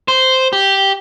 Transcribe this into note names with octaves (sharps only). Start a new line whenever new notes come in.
C5
G4